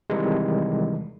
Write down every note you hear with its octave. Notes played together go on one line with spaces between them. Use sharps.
C3 D#3 E3 G3 G#3